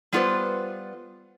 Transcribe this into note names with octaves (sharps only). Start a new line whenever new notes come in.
G3 B3 F4 A4 B4 C5